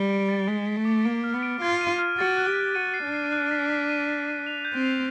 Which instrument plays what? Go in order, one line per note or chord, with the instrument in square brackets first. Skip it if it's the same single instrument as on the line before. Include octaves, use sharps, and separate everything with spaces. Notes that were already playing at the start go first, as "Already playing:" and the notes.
Already playing: [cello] G3 [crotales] G7
[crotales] D7
A6
[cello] G#3 [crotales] B6
[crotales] B6
[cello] A3
[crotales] D6
[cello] A#3 [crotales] D7
[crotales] F6
[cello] B3
[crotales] D7
[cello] F4 [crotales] G#6
[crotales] D#7
F6
[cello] F#4 [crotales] A6
[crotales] F#6
[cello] G4
[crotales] F#6
[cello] F#4 [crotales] D#7
[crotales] C7
[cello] D4
[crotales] C7
F#6
B6
B6
D#7
B6
D#7
F7
G6
[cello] C4
[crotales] F7